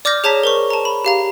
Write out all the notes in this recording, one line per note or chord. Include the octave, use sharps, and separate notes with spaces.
D5 D6 F6 G6 A#6
G#4 C#5 A5 A#5 B6
A#4 C5 C#6
A5 A#5
B5
G4 F5 A#5